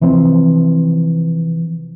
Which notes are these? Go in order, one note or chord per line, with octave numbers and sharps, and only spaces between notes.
C3 E3 F3 C4